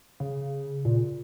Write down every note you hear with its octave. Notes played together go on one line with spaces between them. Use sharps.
C#3
A#2